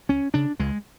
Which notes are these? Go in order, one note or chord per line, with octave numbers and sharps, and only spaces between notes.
C#2 C#4
C#3 D4
C#2 G#3